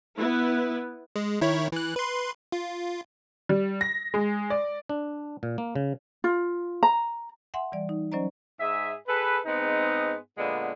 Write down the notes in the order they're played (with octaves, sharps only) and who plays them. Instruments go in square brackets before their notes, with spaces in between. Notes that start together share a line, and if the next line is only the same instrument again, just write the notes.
[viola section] B3 E4 B4
[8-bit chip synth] G#3
D#3 E4 C#5
E3 F#6
B4 C6
F4
[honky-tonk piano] G3
A#6
G#3
D5
[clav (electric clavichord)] D4
A#2
A#3
C#3
[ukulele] F4
A#5
[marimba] E5 F#5 G#5 C6
E3 G3 D5
D#4
F#3 C#4 C5 D5 D#5 A#5
[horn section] G#2 G#4 E5
G#4 A4 B4
G#2 G#3 B3 C4 D#4
A#2 D3 G#3 B3